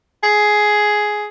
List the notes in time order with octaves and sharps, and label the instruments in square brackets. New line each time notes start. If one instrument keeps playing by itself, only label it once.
[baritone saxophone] G#4